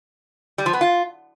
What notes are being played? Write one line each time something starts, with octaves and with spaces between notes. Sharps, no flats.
G3
F3
B3
F4